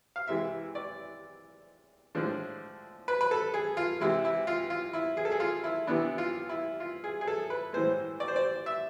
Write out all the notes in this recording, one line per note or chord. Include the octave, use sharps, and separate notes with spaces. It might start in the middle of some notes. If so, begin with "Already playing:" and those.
F5
C3 E3 G#3 E5
D5
A2 F3 G#3 D4
B4
B4
A4
G#4
F4
C3 E3 G#3 E4
E4
F4
F4
E4
G#4
A4
G#4
F4
E4
C3 E3 B3 D4 E4
F4
E4
F4
G#4
G#4
A4
B4
A2 E3 G#3 C5
D5
C5
D5
E5